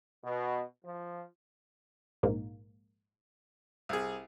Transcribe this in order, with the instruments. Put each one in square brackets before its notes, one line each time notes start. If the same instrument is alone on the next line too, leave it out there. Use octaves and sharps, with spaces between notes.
[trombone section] B2
F3
[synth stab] A#1 G#2 A#3
[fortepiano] C2 G#4